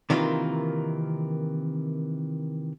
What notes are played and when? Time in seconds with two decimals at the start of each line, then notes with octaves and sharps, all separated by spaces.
0.10 C3 D#3 E3 A#3 F4